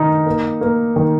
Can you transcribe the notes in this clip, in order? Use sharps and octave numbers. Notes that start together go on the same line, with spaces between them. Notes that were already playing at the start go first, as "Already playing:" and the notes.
Already playing: D#3 D#4
A#3
A#3
D#3